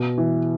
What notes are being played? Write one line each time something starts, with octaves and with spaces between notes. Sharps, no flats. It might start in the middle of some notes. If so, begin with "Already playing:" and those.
Already playing: B2
E3